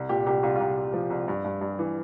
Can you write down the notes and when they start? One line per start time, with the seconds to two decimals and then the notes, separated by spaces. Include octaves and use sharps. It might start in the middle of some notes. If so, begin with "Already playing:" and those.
Already playing: C2
0.09 A#2 G4
0.26 C2 G4
0.43 C2 F4
0.56 F4
0.60 C2 G4
0.77 C2
0.94 F3
1.10 C2
1.28 G2
1.45 G2
1.61 G2
1.79 E3